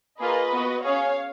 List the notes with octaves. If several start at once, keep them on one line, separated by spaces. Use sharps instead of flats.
A#3 F4 G#4 B4 D#5
B3 F#4
C#4 G#4 C#5 F5